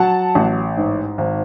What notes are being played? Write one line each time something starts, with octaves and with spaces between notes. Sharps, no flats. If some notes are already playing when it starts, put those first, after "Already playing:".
Already playing: F#3 F#5 A5
A1
G#2
G#1